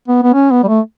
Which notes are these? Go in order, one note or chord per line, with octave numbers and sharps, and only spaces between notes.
B3
B3
C#4
B3
G3
A3